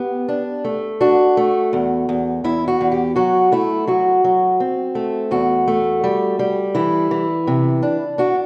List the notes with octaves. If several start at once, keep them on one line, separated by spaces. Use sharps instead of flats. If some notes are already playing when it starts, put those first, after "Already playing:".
Already playing: B3 G4
D4
A3
D4 F#4
A3
E2
E2
E2 E4
F#4
E2
G4
F#3 F#4
A3 E4
F#3 F#4
F#3
C4
A3
E2 F#4
A3
G3
G3
E3 E4
E3
C3
D4
D4 F#4